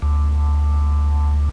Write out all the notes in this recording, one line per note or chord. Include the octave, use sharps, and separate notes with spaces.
D2